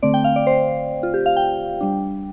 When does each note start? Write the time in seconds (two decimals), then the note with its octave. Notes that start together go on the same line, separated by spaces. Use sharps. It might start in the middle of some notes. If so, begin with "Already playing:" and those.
0.03 D3 A3 C4 D5
0.14 G5
0.24 F5
0.36 D5
0.47 C5
1.03 F4
1.14 G4
1.26 F5
1.37 G5
1.81 G3 D4